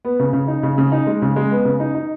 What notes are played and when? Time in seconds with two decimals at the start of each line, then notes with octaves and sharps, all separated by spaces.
0.05 B3
0.19 C#3
0.33 C#3
0.48 D#4
0.63 C#3
0.78 C#3
0.92 D#4
1.06 G#3
1.22 C#3
1.36 G#3
1.51 B3
1.65 C#3
1.80 D#4
1.95 D#4